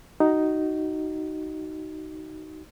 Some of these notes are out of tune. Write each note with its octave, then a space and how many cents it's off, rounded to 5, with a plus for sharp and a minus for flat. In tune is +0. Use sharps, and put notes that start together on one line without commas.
D#4 +0 F#4 +25